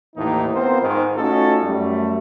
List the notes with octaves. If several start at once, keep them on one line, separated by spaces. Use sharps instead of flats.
D#2 A2 E3 A3 A#3 D#4
B3 C4 F4 A#4 C5
G#2 D#3
A3 C#4 D#4 F4 F#4 A4
F#2 G3 A3